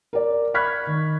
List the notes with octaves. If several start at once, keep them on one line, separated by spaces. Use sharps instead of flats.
A#4 D5
B5 C#6 F6 F#6 G#6 B6
D#3